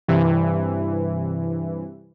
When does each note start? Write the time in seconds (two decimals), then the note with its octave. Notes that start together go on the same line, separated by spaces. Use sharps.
0.08 G2 C3 E3